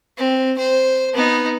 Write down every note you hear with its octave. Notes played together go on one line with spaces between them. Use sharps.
C4
C5
B3 D#4